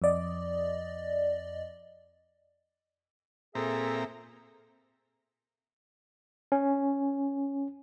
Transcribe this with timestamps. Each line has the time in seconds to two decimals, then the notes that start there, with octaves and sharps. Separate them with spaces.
0.02 F2 D5 D#5
3.55 A#2 C4 G#4 A4 E5 A#5
6.52 C#4